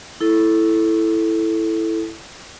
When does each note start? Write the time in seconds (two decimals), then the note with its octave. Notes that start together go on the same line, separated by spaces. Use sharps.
0.20 E4 A4